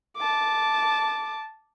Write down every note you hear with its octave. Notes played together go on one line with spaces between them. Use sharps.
A5 D6